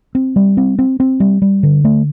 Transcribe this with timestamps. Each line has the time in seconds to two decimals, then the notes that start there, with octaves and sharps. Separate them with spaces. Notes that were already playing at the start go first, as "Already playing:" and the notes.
0.15 C4
0.36 G3
0.57 C4
0.79 C4
1.00 C4
1.20 G3
1.42 G3
1.63 D3
1.84 A3